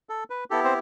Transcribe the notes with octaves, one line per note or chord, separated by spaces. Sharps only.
A4
B4
B3 E4 G4 A4
C4 C5